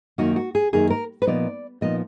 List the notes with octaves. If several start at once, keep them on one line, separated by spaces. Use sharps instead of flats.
F#2 D#3 A#3 D#4 F#4
F#4
G#4
F#2 D#3 A#3 D#4 G#4
A#4
B4
A#2 F3 B3 D#4 D5
A#2 F3 B3 D#4 D#5